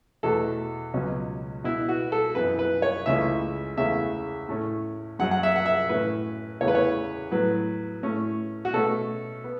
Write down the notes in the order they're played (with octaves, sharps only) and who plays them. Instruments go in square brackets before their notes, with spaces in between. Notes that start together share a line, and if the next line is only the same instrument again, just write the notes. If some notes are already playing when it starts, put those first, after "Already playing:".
[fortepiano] E2 B2 A3 A4
C#2 B2 F#3 C#4
B2 E4
B3
F#4
A4
F#2 E3 B3 B4
B4
C#5
C#2 C#3 E3 A3 C#4 E5
E2 C#3 A3 C#4 E5
A2 A3 C#4
F#2 F#3 C#4 F#5
F#5
E5
F#5
E5
A2 E3 C#4 B4
E2 C#3 E3 A3 C#5
B4
C#5
A2 F#3 B3 B4
A2 A3 C#4
F#4
B2 A3 C#4 A4
B3